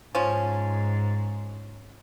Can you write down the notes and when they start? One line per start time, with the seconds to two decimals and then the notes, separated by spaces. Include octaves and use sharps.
0.15 G#2 F3 C#4